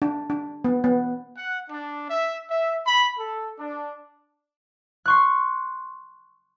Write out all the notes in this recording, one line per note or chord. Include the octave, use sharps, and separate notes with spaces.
D4
D4
B3
B3
F#5
D4
E5
E5
B5
A4
D4
C6 C#6 F#6